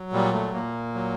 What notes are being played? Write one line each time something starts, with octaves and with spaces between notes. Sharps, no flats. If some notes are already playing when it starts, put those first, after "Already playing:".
Already playing: F#3
A#2 G3
A3
A#2 A#3
F#3